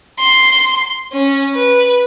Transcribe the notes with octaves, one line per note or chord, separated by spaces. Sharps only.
C6
C#4
B4